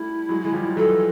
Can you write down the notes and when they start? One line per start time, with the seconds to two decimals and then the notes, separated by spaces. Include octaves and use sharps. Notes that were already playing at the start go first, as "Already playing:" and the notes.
Already playing: G3 A3 E4
0.29 F#3 G#3
0.45 G#3
0.53 F3 G3
0.77 E3 F#3 A4